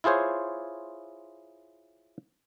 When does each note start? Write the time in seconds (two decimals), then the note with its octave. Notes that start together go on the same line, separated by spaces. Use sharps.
0.04 E4 F4 G#4 C5 C#5